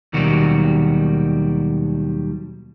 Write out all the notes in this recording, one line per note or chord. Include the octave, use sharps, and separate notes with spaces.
D#2 B2 D#3 F#3 G3 F#4